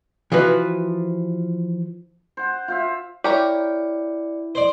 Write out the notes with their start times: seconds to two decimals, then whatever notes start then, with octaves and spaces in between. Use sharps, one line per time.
0.32 E3 F3 F#4 B4
2.37 C5 F#5
2.68 F4 C5 E5
3.24 E4 G4 A#4 C#5 D5 C#7
4.55 C5 D5